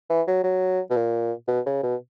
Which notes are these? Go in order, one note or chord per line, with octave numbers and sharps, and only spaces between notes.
E3
F#3
F#3
B2
A#2
B2
C#3
B2